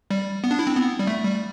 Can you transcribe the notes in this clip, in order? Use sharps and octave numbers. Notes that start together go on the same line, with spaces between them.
G3
B3
D4
E4
C4
B3
G3
A3
G3